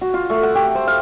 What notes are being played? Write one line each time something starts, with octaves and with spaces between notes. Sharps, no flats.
F#4
F4
A3
F#5
G4
C5
F5